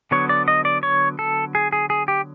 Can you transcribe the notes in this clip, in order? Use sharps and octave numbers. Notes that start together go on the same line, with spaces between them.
D3 F#3 B3 C#5
D5
D#5
D5
C#5
A4
G#4
G#4
G#4
G4